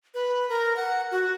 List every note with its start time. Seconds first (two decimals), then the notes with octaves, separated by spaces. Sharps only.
0.14 B4
0.49 A#4
0.76 F#5
1.11 F#4